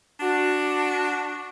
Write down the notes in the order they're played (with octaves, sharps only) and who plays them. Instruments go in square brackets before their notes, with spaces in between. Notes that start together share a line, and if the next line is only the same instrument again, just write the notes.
[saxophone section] D4 F#4